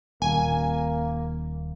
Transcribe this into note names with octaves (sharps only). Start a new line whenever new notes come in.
D#1 A#3 G#5